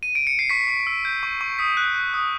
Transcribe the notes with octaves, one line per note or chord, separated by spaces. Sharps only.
D#7
D7
C#7
C7
C#6 B6
C#6
E6
G6
C#6
C#6
D#6 B6
F#6
F#6
D#6